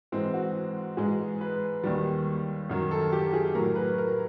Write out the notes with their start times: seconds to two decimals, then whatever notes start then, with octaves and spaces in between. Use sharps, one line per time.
0.12 G#2 E3 G#3 C4
0.34 F#4
0.97 G#2 E3 G#3 G#4
1.41 B4
1.84 D#2 D#3 G3
2.70 F#2 D#3 F#3
2.91 A4
3.12 G4
3.33 G#4
3.55 A2 F#3 A#4
3.76 B4
3.98 A#4